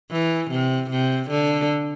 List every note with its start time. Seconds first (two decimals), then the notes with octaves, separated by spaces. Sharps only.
0.11 E3
0.51 C3
0.90 C3
1.30 D3